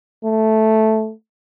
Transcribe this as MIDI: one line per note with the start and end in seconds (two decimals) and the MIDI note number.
0.25 1.12 57